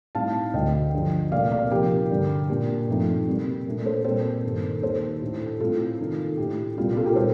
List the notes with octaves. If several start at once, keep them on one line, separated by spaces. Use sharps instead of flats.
A2 G3 C4 D#4 F5 A5
D2 D3 A3 D4 D#5 G5
G2 D3 F3
C2 A#2 A3 C4 D5 F5
A#4 D5
C3 F3 A#3 D#4 G4 A#4
G2 D3 G3
A#2 G3 D4 G4
G2 F3 A3 C4 D#4
C3 G3 A#3
A#2 A3 D4
A4 C5
A#2 G3 C4 A4 C5
G2 D#3 A#3 D4
D#2 D#3 A#3 D#4 A4 C5
A2 A3 D4
A2 G3 C4 F4 A4
C3 D#3 A#3 D#4
A2 A3 D4 G4
C2 A#2 G3 D4 F4
F4 A4
G4 A#4
A#2 G3 C4 D#4 A4 C5